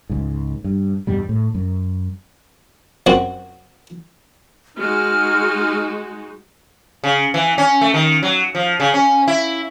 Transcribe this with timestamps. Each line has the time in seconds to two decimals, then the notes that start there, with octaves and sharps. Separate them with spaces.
0.10 C#2 G#2
0.64 G2
1.07 E2 G2 B2 G3
1.29 A2
1.55 F#2
3.06 F#2 C4 F#4
4.78 G#3 D#4 F#4 F6
7.04 C#3
7.34 E3
7.58 C#4
7.81 A3
7.94 D#3
8.23 F#3
8.55 F3
8.80 C#3
8.94 C#4
9.28 E4